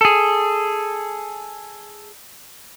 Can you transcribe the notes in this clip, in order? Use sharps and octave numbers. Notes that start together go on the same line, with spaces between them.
G#4 A4